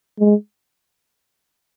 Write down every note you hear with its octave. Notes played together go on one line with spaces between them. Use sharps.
G#3